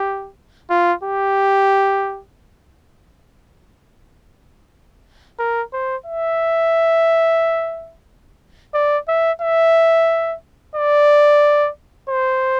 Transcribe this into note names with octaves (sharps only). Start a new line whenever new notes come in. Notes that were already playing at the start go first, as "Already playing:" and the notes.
Already playing: G4
F4
G4
A#4
C5
E5
D5
E5
E5
D5
C5